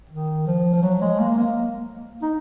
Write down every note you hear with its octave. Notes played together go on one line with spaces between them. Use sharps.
D#3
F3
F3
F#3
G#3
A#3
A#3
D#4